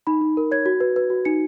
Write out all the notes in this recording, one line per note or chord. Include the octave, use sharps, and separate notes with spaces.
D#4 B5
D#4
A#4
C#5 G#6
F#4
B4
B4
F#4
D#4 C#7